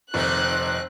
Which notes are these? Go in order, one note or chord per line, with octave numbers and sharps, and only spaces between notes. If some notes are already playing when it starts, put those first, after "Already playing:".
F1 A#2 D#3 A3 C4 F#6